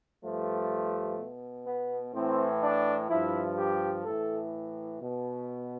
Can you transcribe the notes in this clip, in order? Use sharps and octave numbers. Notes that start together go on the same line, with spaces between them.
G2 F3 A3
B2
B3
A2 E3 C4
D4
G2 F3 E4
G4
A2 E3 A4
B2